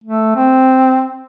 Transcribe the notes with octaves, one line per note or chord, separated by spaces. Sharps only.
A3
C4